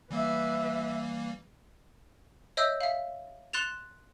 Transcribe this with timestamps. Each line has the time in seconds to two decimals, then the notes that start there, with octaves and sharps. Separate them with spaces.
0.11 E3 G3 A#3 B4 E5
2.57 C#5 D#5 E5 E6 G6
2.81 E5 F5
3.53 C6 F#6 A6 E7 F7